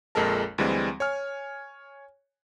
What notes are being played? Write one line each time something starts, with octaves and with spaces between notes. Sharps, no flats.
A#1 F2 G#3 A4 A#4 A5
D2 E3 G3 G#3 C4
C#5 G#5 F6